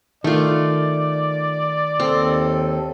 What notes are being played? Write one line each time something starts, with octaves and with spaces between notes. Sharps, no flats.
D#3 A3 F4 D5
D#2 C4 A4